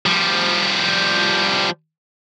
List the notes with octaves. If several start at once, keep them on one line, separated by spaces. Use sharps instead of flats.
F3 G3